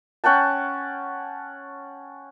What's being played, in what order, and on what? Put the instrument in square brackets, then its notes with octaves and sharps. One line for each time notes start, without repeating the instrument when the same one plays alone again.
[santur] C#4 F#5 G5 A5